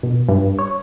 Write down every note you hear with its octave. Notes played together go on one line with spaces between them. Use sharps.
B2
G2
C#5